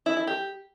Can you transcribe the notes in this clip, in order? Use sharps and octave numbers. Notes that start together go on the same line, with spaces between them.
E4
E4
G4